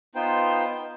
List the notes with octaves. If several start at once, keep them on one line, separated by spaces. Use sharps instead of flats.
B3 D#4 F4 B4 C5 G5